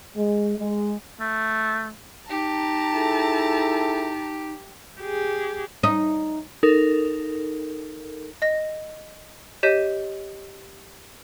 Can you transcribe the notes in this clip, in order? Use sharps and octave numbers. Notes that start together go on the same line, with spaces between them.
G#3
G#3
A3
D#4 G4 A5 A#5
E4 G#4 A4
G4 G#4
D#4
D#4 A4 A#4
D#5 A#6
G4 C#5 D#5 G6 B6 D#7